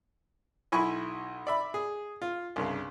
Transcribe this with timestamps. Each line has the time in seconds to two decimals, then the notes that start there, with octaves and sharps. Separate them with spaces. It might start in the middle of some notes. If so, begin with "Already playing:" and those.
0.72 B1 E4 G#5 B5 C#6
1.47 D5 E5 B5
1.74 G#4
2.22 F4
2.56 C2 G2 C#3